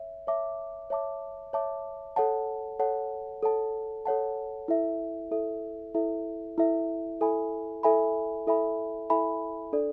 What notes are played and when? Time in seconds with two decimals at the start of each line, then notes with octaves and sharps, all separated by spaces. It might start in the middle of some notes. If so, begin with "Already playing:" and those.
Already playing: C#5 E5
0.27 C#5 E5 A5 D6
0.90 C#5 E5 A5 D6
1.53 C#5 E5 A5 D6
2.16 A4 C#5 F#5 A5
2.79 A4 C#5 F#5 A5
3.43 A4 C#5 F#5 A5
4.05 A4 C#5 F#5 A5
4.68 E4 A4 E5
5.31 E4 A4 E5
5.94 E4 A4 E5
6.58 E4 A4 E5
7.21 E4 A4 E5 G#5 B5
7.83 E4 A4 E5 G#5 B5
8.47 E4 A4 E5 G#5 B5
9.10 E4 A4 E5 G#5 B5
9.73 D4 A4 D5